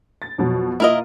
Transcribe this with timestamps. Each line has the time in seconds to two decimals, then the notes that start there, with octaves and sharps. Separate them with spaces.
0.22 A6
0.38 F2 B2 F#3
0.80 A#3 E4 F4 A#4 D#5